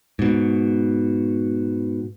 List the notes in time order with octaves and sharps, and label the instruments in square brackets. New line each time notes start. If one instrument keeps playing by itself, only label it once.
[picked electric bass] G#2 B2